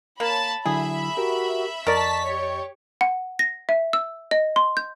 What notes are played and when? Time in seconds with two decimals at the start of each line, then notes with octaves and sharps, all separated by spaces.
0.20 A#3 C#5 A5 B5
0.66 D3 F#3 E4 G#4 E5 B5
1.17 F#4 G4 A#4
1.87 F2 A#4 D5 D#5 A5 C#6 A6 B6
2.24 G4 C#5
3.01 F#5
3.39 A#6
3.69 E5
3.93 E6
4.31 D#5
4.56 C6
4.77 G6